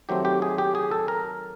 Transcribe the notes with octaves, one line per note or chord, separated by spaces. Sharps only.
D#3 F#3 A3 C4 G4
G4
G#4
G4
G#4
A4
A#4